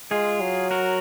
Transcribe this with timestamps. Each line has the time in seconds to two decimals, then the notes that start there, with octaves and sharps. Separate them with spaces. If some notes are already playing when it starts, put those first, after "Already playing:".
0.11 G#3 F4 G#4
0.41 F#3
0.71 F#4 A#4